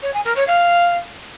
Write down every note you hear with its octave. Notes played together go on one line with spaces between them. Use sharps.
C#5
G#5
A#4
C#5
F5